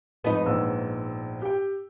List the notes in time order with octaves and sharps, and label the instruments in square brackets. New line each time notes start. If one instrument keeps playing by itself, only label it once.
[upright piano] F2 G#2 B5 [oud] B3 D#4
[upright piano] A#1 G#2 E6
G4 G5